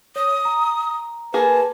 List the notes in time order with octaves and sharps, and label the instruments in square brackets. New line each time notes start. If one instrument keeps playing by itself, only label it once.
[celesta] C#5 [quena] D#6
[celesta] A#5
[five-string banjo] A#3 G#4 [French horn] B4 [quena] A5